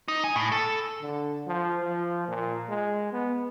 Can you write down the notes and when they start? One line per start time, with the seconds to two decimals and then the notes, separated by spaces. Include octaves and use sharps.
0.08 D#4
0.24 G#5
0.36 A2
0.52 A4
1.02 D3
1.47 F3
1.81 F3
2.28 A#2
2.69 G#3
3.12 B3